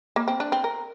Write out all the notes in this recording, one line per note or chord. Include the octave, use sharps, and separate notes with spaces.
A#3
C4
D4
C4
A#4